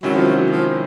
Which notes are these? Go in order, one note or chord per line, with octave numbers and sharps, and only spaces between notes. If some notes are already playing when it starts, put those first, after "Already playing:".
C3 D#3 F#3 G#3 C#4 E4
F3
F#3
F3